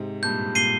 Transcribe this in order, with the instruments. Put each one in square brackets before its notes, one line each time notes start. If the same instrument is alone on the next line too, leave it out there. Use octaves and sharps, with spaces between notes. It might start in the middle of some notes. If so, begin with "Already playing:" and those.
Already playing: [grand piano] G#2 C3
[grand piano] G2 A#2 [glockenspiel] G6
[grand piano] A#2 [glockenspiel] C7 D#7 G7